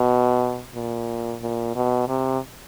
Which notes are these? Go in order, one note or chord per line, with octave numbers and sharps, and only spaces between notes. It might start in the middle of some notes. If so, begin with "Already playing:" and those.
Already playing: B2
A#2
A#2
B2
C3